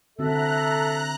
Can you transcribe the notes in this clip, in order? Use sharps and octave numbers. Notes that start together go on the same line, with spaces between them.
D3 C4 F#4 A4 E5 A#5 F#6